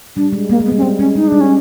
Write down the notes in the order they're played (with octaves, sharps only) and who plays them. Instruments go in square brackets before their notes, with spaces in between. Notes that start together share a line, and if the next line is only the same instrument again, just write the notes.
[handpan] G3 [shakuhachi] D4
[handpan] G#3
[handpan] G#3 [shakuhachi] A#3
[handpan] G#3
[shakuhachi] B3
[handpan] G3
[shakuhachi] C#4
[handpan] G#3 [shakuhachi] C4
[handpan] G#3 [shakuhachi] C#4
[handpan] G#3 [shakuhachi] D#4
[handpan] G3 [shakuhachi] D4
[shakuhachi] C#4